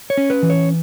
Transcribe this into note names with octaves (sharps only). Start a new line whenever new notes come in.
C#5
C#4
B4
E3
C#5